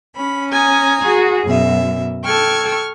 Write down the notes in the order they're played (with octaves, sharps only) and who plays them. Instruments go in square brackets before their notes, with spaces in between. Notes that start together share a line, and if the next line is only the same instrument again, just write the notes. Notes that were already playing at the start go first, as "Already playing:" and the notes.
[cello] C#4 [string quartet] B5
[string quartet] G#5 A#5 D#6
[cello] F#4 G#4
[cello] F#2 [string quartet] B2 E5
[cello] A4 G5 [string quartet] C#6 F6 G#6